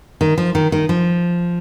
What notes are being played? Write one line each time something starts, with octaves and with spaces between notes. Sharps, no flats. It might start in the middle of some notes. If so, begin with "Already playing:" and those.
D#3
F3
D#3
D#3
F3